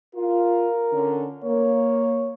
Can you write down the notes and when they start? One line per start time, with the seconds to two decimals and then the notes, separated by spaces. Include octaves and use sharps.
0.15 F4 A#4
0.93 D3 C#4
1.44 A#3 C#5